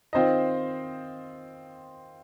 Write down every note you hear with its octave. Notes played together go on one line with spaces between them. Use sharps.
D#3 C4 F4 C5 D#5